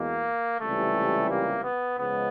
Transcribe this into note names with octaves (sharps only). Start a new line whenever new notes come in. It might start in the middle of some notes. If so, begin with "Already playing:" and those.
Already playing: E2 B2 G#3 A#3
C#2 C3 E3 G3 A3
A#3
B3
C#2 C#3 F3 G#3 B3